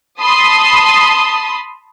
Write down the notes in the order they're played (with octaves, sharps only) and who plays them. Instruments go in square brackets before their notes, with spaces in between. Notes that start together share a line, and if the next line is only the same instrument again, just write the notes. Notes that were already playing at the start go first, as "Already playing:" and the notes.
[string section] A5 B5 C6 D#6